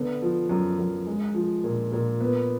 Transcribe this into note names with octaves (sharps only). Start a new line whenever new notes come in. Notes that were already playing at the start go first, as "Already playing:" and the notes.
Already playing: D3 B3
F3
F#2
F#2
G#3
F3
A#2
A#2
B3